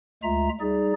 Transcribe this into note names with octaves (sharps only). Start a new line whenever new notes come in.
D2 G#3 F4 E5 A#5
G3 D#4 G#4 D5